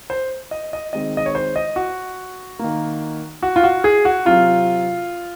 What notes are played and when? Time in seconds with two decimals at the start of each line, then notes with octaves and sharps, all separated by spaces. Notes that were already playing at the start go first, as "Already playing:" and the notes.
0.10 C5
0.51 D#5
0.73 D#5
0.93 D#3 G#3 C4 D#5
1.17 D#5
1.26 C#5
1.35 C5
1.56 D#5
1.76 F#4
2.59 D#3 A#3
3.43 F#4
3.56 F4
3.64 F#4
3.84 G#4
4.05 F#4
4.25 C3 F#3 C4 F4